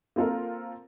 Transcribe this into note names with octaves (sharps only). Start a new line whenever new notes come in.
A#3 C4 F4 A4 A#4